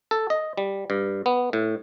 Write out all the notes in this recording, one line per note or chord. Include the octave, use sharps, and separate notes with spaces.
A4
D#5
G3
G2
B3
A2